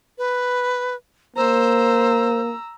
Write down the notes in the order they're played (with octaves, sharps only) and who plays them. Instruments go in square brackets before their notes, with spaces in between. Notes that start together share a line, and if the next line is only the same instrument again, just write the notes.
[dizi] B4
[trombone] A#3 [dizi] C5 [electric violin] A#5 E6